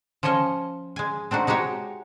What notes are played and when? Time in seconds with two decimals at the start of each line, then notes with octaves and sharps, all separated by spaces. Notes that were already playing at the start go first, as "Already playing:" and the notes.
0.23 F3 C#4 C#5 D#5 G#5
0.96 G#3 G#5
1.31 C4 D4 D#4 F#4
1.47 G#3 D#4 F#4 G4 C#5